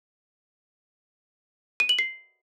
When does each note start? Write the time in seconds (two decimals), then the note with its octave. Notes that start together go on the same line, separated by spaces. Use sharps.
1.80 D#7
1.89 F#7
1.99 C7